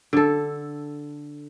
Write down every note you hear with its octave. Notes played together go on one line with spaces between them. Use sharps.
D3 A4